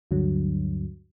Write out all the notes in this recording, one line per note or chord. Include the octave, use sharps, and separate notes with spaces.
D2 G2 D3 F#3